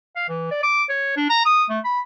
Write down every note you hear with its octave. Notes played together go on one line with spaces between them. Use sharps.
F5
E3
D5
D6
C#5
D4
A#5
D#6
A3
B5